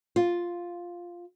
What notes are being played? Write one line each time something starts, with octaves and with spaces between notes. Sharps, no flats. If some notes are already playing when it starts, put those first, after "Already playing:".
F4